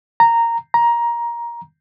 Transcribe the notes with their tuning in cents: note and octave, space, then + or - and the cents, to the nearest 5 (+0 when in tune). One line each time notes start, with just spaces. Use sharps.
A#5 -10
A#5 +15